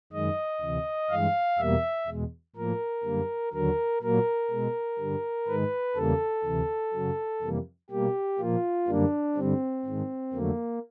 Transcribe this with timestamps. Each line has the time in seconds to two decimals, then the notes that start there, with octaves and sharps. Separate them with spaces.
0.13 F#2 D#3 G#3 D#5
0.61 D2 C3 E3
1.10 G2 E3 G#3 F5
1.59 E2 B2 G3 A#3 E5
2.07 E2 B2 G#3
2.56 A2 F3 A#3 A#4
3.04 F#2 D3 G3 A#3
3.53 D#2 D3 F#3 A#4
4.02 A#2 F#3 A#3 A#4
4.50 B2 G#3
4.99 G2 D3 G3
5.47 G#2 D#3 G#3 B4
5.96 E2 C#3 E3 G3 A#3 A4
6.44 D2 C3 E3
6.93 F#2 C#3 F#3
7.42 F2 C3 E3 G3 A#3
7.90 B2 G3 A#3 G4
8.39 A#2 F3 A#3 F4
8.88 F#2 D3 G3 A#3 D4
9.36 G2 D3 G3 C4
9.85 G#2 D#3 G#3
10.33 F2 D3 F#3 A3 A#3